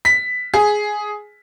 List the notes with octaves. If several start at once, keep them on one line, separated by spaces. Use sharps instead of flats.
B6
G#4